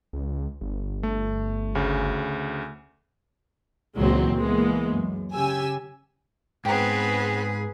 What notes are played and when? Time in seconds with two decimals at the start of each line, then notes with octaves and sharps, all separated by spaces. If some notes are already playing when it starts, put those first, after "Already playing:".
0.13 C#2
0.61 G1
1.03 A3
1.75 D2 C#3
3.97 C#2 A#2 E3 F#3 G#3 C4
4.37 E3 G#3 A#3 B3
4.96 F#2
5.33 C#3 G4 G#5 E6
6.65 G#2 B3 C4 G#4 B4 G5 A#5